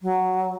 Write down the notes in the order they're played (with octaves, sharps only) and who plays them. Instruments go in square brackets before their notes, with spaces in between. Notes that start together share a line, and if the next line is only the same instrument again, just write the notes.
[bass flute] F#3